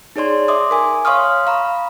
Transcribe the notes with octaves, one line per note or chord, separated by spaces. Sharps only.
D#4 G#4 C#5 D5 C6
E5 C6 D6 D#6
A#4 G#5
C#5 F5 C6 C#6 D#6 F6
F5 A#5 B5